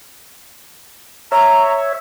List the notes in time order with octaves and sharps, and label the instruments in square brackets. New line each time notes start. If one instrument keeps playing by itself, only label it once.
[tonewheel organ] C#5 E5 [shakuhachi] A#5